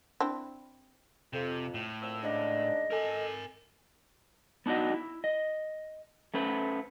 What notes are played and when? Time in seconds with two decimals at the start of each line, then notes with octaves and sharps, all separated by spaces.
0.20 C4 D4 E4
1.33 F2 C3
1.74 A2
2.01 A#2 C4 E6
2.23 G#2 C#3 D4 D#5
2.91 A4 A#4 G#5
4.66 B3 D4 D#4 F#4 D#5
4.94 E4
5.24 D#5
6.34 A3 C#4 B4 C5